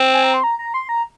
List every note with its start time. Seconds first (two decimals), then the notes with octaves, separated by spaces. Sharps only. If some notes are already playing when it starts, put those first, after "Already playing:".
Already playing: C4
0.14 G#5
0.24 A#5
0.34 C6
0.44 A#5
0.59 A#5
0.74 C6
0.89 A#5